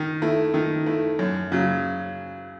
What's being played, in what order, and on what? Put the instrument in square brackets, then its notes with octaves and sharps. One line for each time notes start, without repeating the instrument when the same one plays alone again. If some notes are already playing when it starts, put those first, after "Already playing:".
Already playing: [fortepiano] D#3
A3 E4
D#3
A3 E4
F#2
C#3 F#3